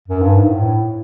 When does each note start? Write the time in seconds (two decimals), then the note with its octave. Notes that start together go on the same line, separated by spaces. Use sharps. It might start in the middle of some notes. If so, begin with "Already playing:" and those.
0.08 F#2
0.22 G2
0.37 G#2
0.51 A2